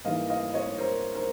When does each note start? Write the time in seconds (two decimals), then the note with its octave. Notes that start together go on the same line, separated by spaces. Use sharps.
0.05 G#2 E3 G3 A#3 D#5 F5
0.30 D#5 F5
0.54 C#5 D#5
0.78 A#4 C5
1.15 A#4 C5